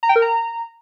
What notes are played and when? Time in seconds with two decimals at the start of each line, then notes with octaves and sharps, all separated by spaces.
0.03 A#5
0.09 G5
0.16 A#4
0.22 A#5